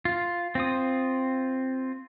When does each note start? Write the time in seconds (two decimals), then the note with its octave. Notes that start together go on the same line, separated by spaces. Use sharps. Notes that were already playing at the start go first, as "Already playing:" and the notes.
0.05 F4
0.55 C4 F4 D#6